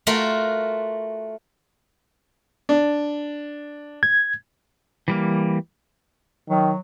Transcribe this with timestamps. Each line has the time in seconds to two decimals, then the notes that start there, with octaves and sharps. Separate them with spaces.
0.07 A3 F4 F#4 A#4
2.69 D4
4.03 G#6
5.08 E3 G3 A#3
6.50 D#3 F#3